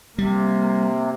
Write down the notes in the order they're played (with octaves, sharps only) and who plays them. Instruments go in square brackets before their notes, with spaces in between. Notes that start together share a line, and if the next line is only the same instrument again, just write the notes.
[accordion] C3 [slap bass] G3 [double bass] A#3